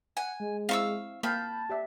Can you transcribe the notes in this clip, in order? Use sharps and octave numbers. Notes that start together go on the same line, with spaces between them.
F#5 G#5
G#3
C4 E4 F5 C#6 E6
A#3 F5 G5 A5 B5 G6
G4 D5 E5